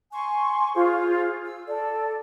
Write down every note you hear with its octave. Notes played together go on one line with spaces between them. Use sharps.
G#5 C6 C#6
F4 G#4 C5
E6
A4 D5